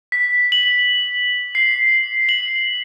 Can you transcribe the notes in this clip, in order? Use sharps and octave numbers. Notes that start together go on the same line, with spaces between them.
B6
F#7
C7
F#7